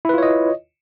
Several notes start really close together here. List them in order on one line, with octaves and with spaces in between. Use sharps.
E4 B4 F4 C#5 D#5